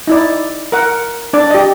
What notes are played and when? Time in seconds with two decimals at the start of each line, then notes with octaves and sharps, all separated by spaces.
0.07 D#4 E4 D5
0.72 A#4 F#5
1.33 D4 D5
1.50 G4 D#5